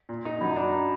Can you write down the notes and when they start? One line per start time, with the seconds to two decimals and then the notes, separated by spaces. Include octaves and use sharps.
0.09 A#2
0.25 D#4
0.41 F#2 B5
0.51 A#5
0.56 D4
0.62 B5
0.73 B5